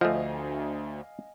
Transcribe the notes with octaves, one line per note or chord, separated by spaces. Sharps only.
D2 F3 A3 D#5 F5 G#5